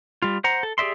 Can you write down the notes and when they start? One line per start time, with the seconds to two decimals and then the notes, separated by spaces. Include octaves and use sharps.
0.22 G3 F4
0.44 C5 F#5 A#5
0.63 A4
0.78 G4 G#4 D5 E5 C6